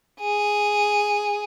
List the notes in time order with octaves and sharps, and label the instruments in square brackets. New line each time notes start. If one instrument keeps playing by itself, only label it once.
[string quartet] G#4